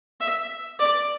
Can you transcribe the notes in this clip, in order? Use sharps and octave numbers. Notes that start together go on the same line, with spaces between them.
E5
D5